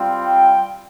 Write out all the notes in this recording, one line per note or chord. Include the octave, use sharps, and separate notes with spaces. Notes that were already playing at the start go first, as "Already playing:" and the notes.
Already playing: G3 C4 F4
G5